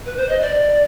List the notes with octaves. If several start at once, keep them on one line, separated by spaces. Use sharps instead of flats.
B4
C5
D#5
D5